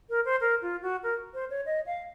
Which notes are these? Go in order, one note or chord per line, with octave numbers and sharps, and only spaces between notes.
A#4
C5
A#4
F4
F#4
A#4
C5
C#5
D#5
F5